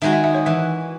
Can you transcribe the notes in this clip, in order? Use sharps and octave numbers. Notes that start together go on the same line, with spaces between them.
D#3 G#3 D#4 F#4 E5
E5
E5
C#5
E3 E5